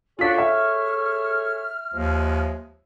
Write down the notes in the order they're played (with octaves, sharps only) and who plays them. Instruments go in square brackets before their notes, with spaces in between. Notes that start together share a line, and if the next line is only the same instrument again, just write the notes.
[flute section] D4 F#4 [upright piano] F4 B6 [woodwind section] G#4 A4 C#5
[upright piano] E5 [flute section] F6
[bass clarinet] D#2 [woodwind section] F3 G#3